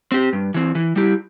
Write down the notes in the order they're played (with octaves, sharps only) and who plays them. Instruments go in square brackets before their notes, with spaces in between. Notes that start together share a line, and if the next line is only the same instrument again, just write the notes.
[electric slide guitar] C4 G4
G2
E3 C4
E3
G3 E4 G4